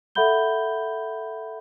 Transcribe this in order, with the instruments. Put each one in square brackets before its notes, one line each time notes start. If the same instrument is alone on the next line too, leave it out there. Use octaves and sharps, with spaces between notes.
[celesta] A4 E5 F#5 B5 G6 G7